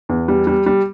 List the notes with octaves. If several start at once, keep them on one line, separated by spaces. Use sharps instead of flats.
E2
G3
G3
G3